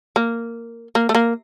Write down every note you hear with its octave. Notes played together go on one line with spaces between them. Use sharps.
A#3
A#3
A3
A#3